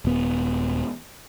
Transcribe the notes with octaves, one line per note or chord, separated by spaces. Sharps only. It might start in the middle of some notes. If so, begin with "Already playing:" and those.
D#1 B3